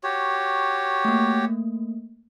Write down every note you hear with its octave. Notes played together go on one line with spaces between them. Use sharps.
F#4 G4 C#5
A3 A#3